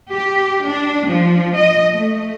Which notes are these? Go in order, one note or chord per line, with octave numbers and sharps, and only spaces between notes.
G4
D4
F3
D#5
A3